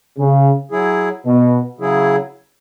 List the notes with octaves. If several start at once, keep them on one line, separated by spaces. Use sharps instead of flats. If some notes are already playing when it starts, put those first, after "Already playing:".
C#3
F#3 E4 G#4
B2
C#3 F#3 E4 G#4